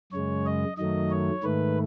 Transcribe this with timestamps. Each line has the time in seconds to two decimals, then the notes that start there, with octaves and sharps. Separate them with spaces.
0.12 F#2 C#3 G#3 C#5
0.46 D#5
0.77 F#2 D#3 F#3 A3 D#5
1.11 C#5
1.43 G#2 D#3 A3 B4